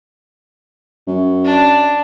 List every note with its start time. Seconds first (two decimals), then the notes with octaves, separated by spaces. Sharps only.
1.07 F#2
1.45 D4